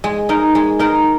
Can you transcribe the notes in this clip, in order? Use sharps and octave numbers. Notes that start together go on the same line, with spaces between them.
G#3
D#4 A#4
G#3
D#4 A#4